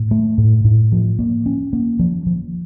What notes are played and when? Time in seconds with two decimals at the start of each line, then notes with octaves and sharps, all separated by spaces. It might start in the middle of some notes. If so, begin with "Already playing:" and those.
Already playing: A2
0.11 A3
0.38 A2
0.64 A2
0.92 F3
1.19 A#3
1.46 C#4
1.73 A#3
1.99 F3
2.26 F3